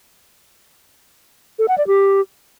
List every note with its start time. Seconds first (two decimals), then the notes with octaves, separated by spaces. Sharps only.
1.59 A4
1.68 F#5
1.78 D5
1.87 G4